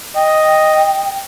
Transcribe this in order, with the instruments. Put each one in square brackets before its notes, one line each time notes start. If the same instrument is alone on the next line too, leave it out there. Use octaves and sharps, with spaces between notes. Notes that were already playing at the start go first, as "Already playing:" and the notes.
[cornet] D#5 [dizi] G5